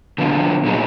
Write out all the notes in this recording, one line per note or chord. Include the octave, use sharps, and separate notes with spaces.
D3 F3 B3 F4
A#2 F#3 B3 D#4 G#4